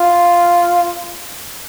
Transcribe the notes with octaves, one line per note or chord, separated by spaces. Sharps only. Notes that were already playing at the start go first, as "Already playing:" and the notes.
Already playing: F4